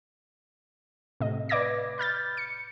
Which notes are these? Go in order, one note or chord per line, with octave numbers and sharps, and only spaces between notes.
A2 C3 D#5
B4 D5 D#5 D6 G#6 A#6
B5 F6 G6 A6
C#7